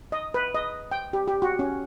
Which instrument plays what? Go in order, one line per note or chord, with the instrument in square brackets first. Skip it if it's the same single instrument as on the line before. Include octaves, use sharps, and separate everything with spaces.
[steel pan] D#5
B4
D#5
G5
G4
G4
F#4
C#4